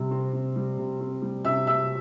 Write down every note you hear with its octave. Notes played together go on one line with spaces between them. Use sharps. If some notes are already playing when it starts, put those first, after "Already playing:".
Already playing: C3 G3
C4
C3
G3
C3
C4
G3
C3 E5 E6
C3 E5 E6